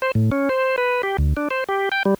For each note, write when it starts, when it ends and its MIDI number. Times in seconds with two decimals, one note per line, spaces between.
0.02 0.12 72
0.15 0.30 45
0.32 0.49 61
0.49 0.76 72
0.78 1.02 71
1.03 1.17 67
1.18 1.33 38
1.37 1.48 62
1.51 1.64 72
1.69 1.89 67
1.92 2.03 79
2.05 2.14 55